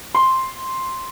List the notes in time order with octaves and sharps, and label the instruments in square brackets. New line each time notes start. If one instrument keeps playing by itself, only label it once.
[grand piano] C6